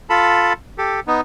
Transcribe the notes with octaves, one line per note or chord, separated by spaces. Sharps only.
F4 A4 A5 B5
G4 A4
B3 D#4